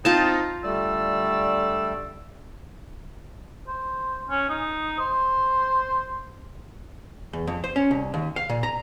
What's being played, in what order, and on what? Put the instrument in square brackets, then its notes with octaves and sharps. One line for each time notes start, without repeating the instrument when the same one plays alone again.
[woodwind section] C4 D#4 [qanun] F4 A5
[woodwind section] D3 D5 E6 [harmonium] G3 A3
[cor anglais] C5
C#4
D#4
C5
[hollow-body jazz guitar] E2
F2
C5
C#4
C2
D#2
F5
A#2
A#5